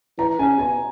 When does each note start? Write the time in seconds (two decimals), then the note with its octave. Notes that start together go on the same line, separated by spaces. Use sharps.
0.18 E3 A#5
0.39 C#3 G#5
0.59 B2 G#5